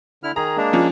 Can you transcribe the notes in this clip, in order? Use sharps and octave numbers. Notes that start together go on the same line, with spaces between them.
D3 E4 F6
D#3 G#4 A#5
G#3 A#3 D4
F3 C#4